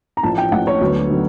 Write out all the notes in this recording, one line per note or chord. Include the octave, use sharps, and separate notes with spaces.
A#5
A1 A2 F3 A5
G5
A1 A2 F3 F#5
C#5
D2 D3 F#3 B3
D3 F#3 B3